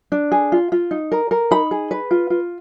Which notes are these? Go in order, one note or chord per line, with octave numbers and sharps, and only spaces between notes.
D4
G#4
F4
F4
D#4
A#4
A#4
D#4 B5
G#4
B4
F4
F4